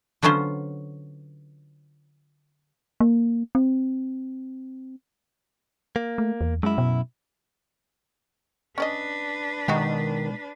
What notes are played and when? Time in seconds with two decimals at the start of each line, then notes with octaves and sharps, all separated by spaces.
0.22 D3 F#3 B3 C#4 F4 C5
3.00 A#3
3.55 C4
5.96 A#3
6.18 A3
6.41 E2
6.63 F#2 G#3 E4
6.78 B2
8.78 C#4 D4 B4 D5 D#5
9.68 B2 D#3 G#3 D#4 F#4 G4